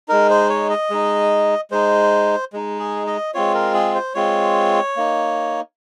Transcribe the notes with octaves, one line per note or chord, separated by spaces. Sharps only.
G#3 D#4 A#4
C5
C#5
D#5
G#3 D#4
G#3 D#4 C5
G#3 D#4
G#4
D#5
G#3 C4 F4 C#5
A#4
G#4
C5
G#3 C4 F4 C#5
A#3 D#4